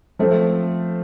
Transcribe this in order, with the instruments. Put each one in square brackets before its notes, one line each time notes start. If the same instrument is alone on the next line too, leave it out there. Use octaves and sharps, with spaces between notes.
[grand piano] F3 A3 C4